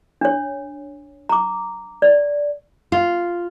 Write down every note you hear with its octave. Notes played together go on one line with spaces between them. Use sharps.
D4 C#5
A#5 D6
D5
F4